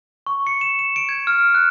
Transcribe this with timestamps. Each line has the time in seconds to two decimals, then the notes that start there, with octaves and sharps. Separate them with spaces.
0.27 C#6
0.47 C#7
0.61 E7
0.79 E7
0.96 D7
1.09 G#6
1.27 F6
1.41 D7
1.55 F#6